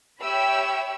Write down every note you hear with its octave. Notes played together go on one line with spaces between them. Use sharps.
G4 C#5 E5 G5 B5 E6